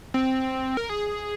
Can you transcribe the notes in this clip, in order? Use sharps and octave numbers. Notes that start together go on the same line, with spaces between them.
C4
A#4
G#4